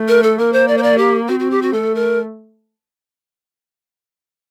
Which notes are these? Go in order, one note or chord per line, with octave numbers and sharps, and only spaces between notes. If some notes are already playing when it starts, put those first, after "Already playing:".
Already playing: A3
A#4
A4
A#3 A#4
C5
D5
C5
D5
G4
C4 F#4
F#4
G4
F#4
A3 A4
A#4